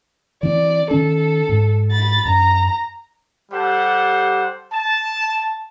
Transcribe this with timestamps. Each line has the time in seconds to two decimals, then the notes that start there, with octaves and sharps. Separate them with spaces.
0.43 E3 C4 D5
0.91 D#3 C#4 A4
1.49 G#2
1.91 B5 A6
2.25 F#2 A#5
3.52 G3 G4 A4 C5 F#5
4.72 A5